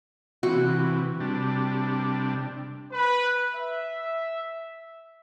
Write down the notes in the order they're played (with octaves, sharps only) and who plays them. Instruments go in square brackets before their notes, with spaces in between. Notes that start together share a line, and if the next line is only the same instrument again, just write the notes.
[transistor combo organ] C3 E3 [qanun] F#4
[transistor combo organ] C3 G3 D4
[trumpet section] B4
E5